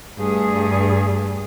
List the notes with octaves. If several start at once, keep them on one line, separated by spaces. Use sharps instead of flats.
G2 A3 G#4